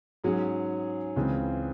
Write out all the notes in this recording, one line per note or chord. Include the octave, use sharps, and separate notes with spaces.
G#2 F#3 C#4 G#4
C#2 C#3 E3 C4